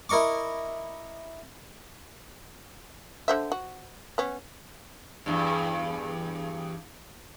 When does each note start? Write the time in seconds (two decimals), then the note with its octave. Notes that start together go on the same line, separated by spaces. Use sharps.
0.09 E4 A#4 D#5 C#6 D6
3.28 D3 C5 E5
3.52 F#4
4.18 B3 C#4
5.26 E2 G2